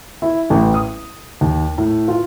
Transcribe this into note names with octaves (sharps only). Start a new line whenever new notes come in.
E4
A1
D#6
D#2
A2
F4